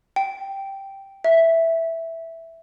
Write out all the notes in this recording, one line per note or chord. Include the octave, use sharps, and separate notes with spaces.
G5
E5